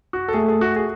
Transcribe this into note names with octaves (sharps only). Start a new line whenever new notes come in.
F#4
A4
A3 G#4
G#4
F#4
G#4